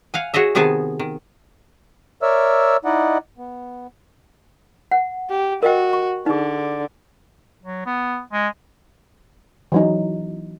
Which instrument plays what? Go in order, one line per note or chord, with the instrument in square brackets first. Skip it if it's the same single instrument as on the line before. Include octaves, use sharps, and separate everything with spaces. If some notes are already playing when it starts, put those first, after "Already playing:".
[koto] F5 F#5 G#5
F#4 G#4 C#5 D#5 E5
C3 D#3 B3 G#4 G#5 A5
D#3
[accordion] A#4 C#5 D5 E5 E6 F6
D#4 E4 D5 D#5 F#5
B3
[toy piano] F#5
[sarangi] G4
[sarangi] F#4 [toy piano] A#4 D#5 G5
[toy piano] C#6
[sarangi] D3 [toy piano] D#4 G#4
[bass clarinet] F#3
B3
G#3
[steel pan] E3 F#3 D#4